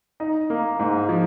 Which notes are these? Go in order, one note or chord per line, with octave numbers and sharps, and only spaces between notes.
D#4
A#3
G#2
F3